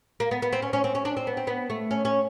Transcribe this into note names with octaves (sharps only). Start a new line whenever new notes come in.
A#3
B3
B3
C4
C#4
C#4
C4
C#4
D4
C4
B3
C4
B3
A3
C#4
C#4